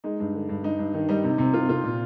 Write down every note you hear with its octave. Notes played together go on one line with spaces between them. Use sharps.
G#3 D#4
G2
D3
G2
G2 D#4
G2
D#3
G3 D#4
C3
C3
C3 F4
C3 F4
A#2